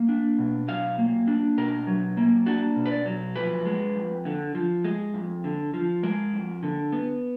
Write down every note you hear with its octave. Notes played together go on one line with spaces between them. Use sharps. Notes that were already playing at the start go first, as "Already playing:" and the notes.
Already playing: A#3
D4
B2
F#3 F5
A#3
D4
B2 A#4
F#3
A#3
D4 F#4
B2
B4
D5
F#3
F3 B4
G#3
F2
D3
F3
G#3
F2
D3
F3
G#3 A#4
F2
D3
B3